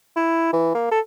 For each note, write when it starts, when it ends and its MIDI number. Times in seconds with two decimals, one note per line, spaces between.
0.16 0.51 64
0.53 0.72 52
0.75 0.87 58
0.92 1.00 69